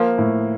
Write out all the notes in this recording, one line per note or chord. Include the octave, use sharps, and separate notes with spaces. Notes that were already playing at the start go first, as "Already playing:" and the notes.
Already playing: F3 A#3
A2